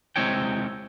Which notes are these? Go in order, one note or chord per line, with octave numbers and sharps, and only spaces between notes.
C3 G#3 C4 E4 C#5 G5